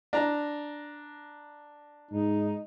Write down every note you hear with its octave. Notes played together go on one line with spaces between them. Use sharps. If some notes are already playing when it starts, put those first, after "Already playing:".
D4 A#5
G#2 D#4